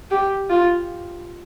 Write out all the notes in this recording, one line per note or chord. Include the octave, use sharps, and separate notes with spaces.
G4
F4